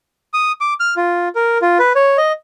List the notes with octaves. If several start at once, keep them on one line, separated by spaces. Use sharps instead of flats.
D#6
D6
F6
F4
A#4
F4
B4
C#5
D#5